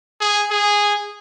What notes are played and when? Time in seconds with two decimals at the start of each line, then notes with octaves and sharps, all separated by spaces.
0.21 G#4
0.51 G#4